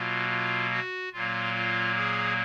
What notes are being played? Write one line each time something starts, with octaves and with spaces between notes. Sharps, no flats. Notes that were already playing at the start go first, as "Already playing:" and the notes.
Already playing: B2 F#3 A#3 F4
F4
F#4
A#2 F#3 A#3 F4
F4
G#4